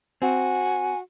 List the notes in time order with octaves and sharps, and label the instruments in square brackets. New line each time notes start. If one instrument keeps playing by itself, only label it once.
[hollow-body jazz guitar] C4 [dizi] F#4 [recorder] G#5